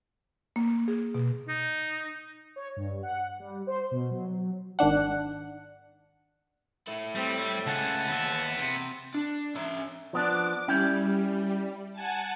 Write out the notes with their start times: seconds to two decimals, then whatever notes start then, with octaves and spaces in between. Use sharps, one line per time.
0.56 A#3
0.88 G#4
1.15 B2
1.48 D#4
2.56 C#5
2.76 G2
3.03 F#5
3.40 G3
3.67 C5
3.91 B2
4.11 F#3
4.79 G#1 D#3 D4 F#5
6.88 A3 E4
7.16 G3 C4
7.38 E5
7.67 C#2 G#4 F#5 A5
8.09 D#2 B3 E5
8.59 C3
9.15 D4
9.56 C#4 E5
10.13 F3 B3 D4 D6
10.68 G3 C#4 E4 G5
11.93 F#5 G#5 A5